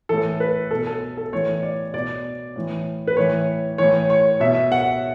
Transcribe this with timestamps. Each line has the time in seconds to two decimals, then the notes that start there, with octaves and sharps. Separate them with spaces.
0.09 A2 E3 A4
0.40 B4
0.71 B2 A4
0.87 A4
1.17 A4
1.32 A2 E3 C#5
1.63 D5
1.93 B2 D5
2.56 A2 E3
3.07 B4
3.17 A2 E3 C#5
3.78 A2 E3 C#5
4.10 C#5
4.40 B2 E5
4.72 F#5